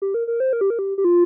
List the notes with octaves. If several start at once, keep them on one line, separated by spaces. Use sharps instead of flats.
G4
A#4
A#4
C5
A#4
G4
A#4
G4
G4
F4